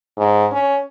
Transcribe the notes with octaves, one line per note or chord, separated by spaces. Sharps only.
G#2
C#4